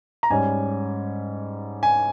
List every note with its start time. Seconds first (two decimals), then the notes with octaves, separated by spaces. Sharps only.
0.23 A#5
0.30 G#2 G3 C#4 G#5
1.83 G#5